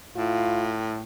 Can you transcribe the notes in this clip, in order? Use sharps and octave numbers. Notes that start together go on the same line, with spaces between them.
A2 F4